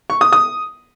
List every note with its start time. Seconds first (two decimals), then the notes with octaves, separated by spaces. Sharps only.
0.10 C#6
0.21 D#6
0.32 D#6